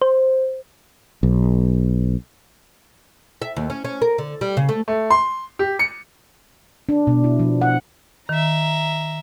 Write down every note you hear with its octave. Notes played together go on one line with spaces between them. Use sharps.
C5
B1
E5
D#2
C#4
C#4
A#4
D3
G3
C#3
A3
A3
C6
G4
C#7
D4
B2
E4
F3
F#5
D#3 E5 A#5